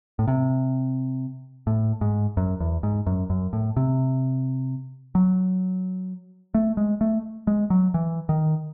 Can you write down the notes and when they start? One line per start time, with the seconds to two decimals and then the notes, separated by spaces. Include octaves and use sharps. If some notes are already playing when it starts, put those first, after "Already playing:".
0.19 A2
0.28 C3
1.67 A2
2.01 G#2
2.37 F#2
2.60 E2
2.83 G#2
3.07 F#2
3.30 F#2
3.53 A2
3.77 C3
5.15 F#3
6.55 A3
6.77 G#3
7.01 A3
7.47 G#3
7.70 F#3
7.94 E3
8.29 D#3